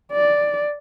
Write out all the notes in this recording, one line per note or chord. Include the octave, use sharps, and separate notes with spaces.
D5